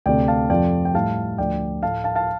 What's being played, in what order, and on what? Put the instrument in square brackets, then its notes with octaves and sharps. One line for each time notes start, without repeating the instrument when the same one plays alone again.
[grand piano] D2 C3 A3 D5 G5
F5 A5
F2 C3 F3 A3 D5 G5
G5
A2 G3 F5 A5
D2 D3 F3 A3 D5 G5
A2 A3 F5 A5
F5 A5
F5 A5